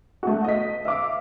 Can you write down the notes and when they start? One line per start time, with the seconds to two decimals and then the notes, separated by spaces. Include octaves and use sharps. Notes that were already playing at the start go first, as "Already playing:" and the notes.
0.23 A3 F#4
0.44 D#5 B6
0.85 E5 F5 D6